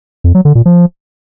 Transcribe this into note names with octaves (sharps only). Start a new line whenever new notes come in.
F2
F#3
D3
A#2
F3